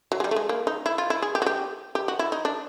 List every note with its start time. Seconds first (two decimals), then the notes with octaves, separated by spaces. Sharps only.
0.12 F#3
0.20 G#3
0.24 G3
0.31 A3
0.36 G#3
0.49 A#3
0.67 D#4
0.86 E4
0.98 F4
1.10 E4
1.22 G#4
1.35 G4
1.42 F#4
1.46 G4
1.95 G4
2.08 F#4
2.19 E4
2.32 D#4
2.45 D4